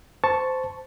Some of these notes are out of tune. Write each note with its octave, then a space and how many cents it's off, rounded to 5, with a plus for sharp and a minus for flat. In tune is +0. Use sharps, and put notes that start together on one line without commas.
C5 -20 A5 +0 C#6 +0